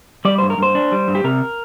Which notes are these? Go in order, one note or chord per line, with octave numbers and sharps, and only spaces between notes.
G3 D5
G2 C5
A#4
G2 C5
D4
G3
G2
G4
C3 A#4